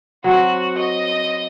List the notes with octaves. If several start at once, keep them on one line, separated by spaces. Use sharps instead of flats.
F#3 C4 F#4
D#5